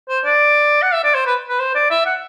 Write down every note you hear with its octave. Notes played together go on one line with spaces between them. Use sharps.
C5
D5
F#5
E5
D5
C5
B4
B4
C5
D5
E5
F#5